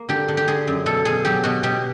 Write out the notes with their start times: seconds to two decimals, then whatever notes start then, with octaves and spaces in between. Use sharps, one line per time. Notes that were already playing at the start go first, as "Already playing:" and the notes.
Already playing: A#3
0.09 D3 G4
0.28 D3
0.37 G4
0.48 D3 G#4
0.67 F#2
0.86 B2 A4
1.05 B2 G#4
1.25 F#3 G4
1.43 B2 F#4
1.63 B2 G4